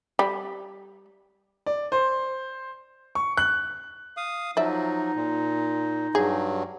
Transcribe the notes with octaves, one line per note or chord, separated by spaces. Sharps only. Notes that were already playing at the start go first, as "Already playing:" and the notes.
G3
D5
C5
C#6
F#6
F5 D#6
F3 F#3 D#4 D5 E5
A#2
G2 F#3 G#4